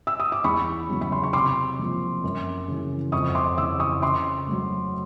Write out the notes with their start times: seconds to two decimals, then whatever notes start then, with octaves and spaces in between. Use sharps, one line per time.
0.07 E6
0.20 D#6
0.32 D6
0.44 E2 B5 C#6
0.89 C#3 F#3 B3
1.01 B5
1.12 C6
1.24 C#6
1.33 C3 C6 D6
1.79 F3 A#3
2.24 F#2
2.68 C#3 E3
3.12 F2 C#6 D#6
3.35 C6 D6
3.58 C#3 E3 D6 E6
3.80 C#6 D#6
4.02 C#3 C6 D6
4.47 F#3 A3